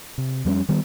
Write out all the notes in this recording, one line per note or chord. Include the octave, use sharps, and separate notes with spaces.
C3
F2 G3 A3 C#4
D#3 G3 B3